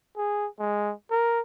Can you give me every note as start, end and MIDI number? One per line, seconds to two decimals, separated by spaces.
0.17 0.47 68
0.60 0.94 56
1.11 1.40 70